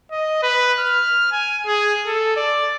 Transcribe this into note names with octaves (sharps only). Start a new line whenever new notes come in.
D#5
B4
F6
G#5
G#4
A4
D5